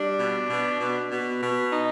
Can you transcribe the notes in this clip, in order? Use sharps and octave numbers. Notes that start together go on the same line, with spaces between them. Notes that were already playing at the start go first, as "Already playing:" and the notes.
Already playing: G3 D4
B2
B2
B2
B2
B2
D#4